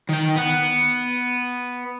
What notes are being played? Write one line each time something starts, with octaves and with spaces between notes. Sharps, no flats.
D#3 G5
B3 F#5